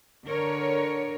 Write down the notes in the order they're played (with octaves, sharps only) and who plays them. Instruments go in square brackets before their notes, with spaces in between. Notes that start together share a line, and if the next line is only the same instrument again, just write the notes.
[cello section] D3 A#4 C#5